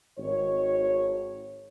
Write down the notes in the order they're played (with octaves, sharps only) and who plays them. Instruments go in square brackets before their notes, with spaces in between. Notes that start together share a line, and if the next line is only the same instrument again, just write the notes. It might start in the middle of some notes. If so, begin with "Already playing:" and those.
[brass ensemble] G#1 C#5